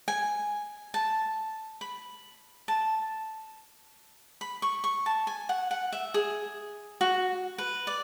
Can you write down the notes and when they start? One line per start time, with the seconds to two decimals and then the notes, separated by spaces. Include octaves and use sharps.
0.08 G#5
0.94 A5
1.81 B5
2.68 A5
4.41 B5
4.62 C#6
4.84 C#6
5.06 A5
5.27 G#5
5.49 F#5
5.71 F#5
5.92 E5
6.14 G#4
7.01 F#4
7.58 B4
7.87 D5